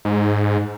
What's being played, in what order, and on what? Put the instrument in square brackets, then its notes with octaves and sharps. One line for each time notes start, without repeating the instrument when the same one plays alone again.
[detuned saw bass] G#2